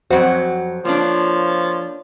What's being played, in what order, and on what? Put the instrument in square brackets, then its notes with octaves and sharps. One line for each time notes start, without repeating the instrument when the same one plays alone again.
[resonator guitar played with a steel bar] F2 F#3 F#4 [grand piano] C5
[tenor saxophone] F3 [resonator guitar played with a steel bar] A#3 D4 [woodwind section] F4 C#5